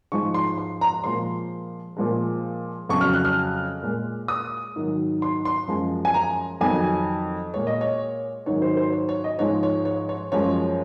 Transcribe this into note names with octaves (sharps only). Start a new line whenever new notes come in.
G#2 F3 G#3 C#6
C6
C6
A#5
A#2 F3 G#3 C6
A#2 F3 G#3
F2 C#3 F#3 C#6
F6
F#6
F6
A#2 G#3
D#6
G#2 D#3 F#3
C6
C6
F#2 F3 G#3
G#5
A#5
F2 D#3 F#3 G#5
A#2 G#3 C#5
D#5
C#5
G#2 D#3 F#3 C#5
C5
C5
C#5
C#5
D#5
G#2 F3 G#3 C#5
C#5
C#5
C#5
F#2 F3 G#3 C#5